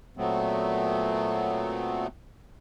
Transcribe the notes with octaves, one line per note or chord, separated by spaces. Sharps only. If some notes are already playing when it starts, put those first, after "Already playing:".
A#2 F#3 A3 B3 C4